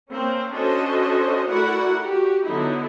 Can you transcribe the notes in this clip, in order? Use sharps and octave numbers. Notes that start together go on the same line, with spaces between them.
A#3 C4 C#4
C#4 D4 F#4 A4 C5 D#5
A3 E4 F#4 A#4 D5 F#5
F#4 G4
D3 F#3 B3 D#4 E4